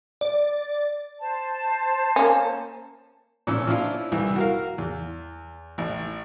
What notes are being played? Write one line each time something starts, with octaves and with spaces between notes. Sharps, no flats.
D5
C5 A5
A#3 C#4
A#2 F3 C#4 E6
F3 C#4 D4 E4 F4
C2 E3
F#4 A#4 F5
E2
A1